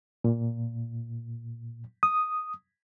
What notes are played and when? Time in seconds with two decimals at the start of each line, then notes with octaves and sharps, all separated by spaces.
0.24 A#2
2.03 D#6